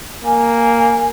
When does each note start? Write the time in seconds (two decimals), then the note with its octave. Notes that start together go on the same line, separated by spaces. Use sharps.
0.25 A#3 G#5